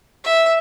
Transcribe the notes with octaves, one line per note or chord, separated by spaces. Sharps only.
E5